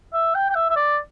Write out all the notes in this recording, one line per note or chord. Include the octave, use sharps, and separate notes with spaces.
E5
G5
G5
E5
E5
D5